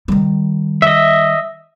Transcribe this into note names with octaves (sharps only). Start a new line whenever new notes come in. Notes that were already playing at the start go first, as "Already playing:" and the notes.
D#3 G3
D#5 E5